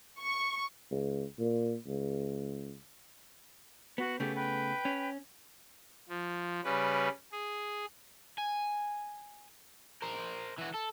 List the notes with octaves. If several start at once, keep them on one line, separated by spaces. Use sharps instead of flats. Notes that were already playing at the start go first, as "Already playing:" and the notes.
C#6
C#2
A#2
C#2
B3 F#4
C#3 A3 B3 G4
B4 G5
C#4
F3
C#3 G3 C#4 B4
G#4
G#5
A#4 C5
E3 F#4
A4